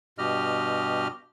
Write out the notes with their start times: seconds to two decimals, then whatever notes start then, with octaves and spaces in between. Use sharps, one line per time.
0.18 G2 B2 G4 D#5 F6